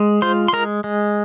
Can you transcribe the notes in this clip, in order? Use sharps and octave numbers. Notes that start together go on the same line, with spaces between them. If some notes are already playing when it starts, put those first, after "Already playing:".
Already playing: G#3
F4 C5 C6
C6
G#3 A#4 A#5
G#3